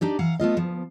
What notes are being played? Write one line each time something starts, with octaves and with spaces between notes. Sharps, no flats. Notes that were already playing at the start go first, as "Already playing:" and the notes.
D4 D#4 G4 D5
E3 F5 F#5 A#5
A3 B3 F4 D#5
D2 F3 B3